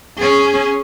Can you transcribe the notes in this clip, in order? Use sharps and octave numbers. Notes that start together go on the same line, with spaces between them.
C#4 G#4